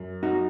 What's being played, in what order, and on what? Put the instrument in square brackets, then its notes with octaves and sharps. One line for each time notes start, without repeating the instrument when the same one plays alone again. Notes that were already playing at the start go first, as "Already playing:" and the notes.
Already playing: [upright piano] F#2
[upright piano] F#3 [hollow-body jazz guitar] D#4 F#4